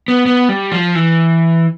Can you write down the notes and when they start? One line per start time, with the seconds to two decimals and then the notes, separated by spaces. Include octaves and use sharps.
0.08 B3
0.26 B3
0.49 G3
0.72 F3
0.95 E3